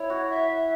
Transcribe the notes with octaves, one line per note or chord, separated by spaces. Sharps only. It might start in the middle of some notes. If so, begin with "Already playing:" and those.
Already playing: E4 C#5
F#4
E5